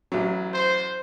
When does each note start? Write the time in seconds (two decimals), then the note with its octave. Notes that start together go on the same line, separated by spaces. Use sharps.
0.12 A1 F#3
0.53 C5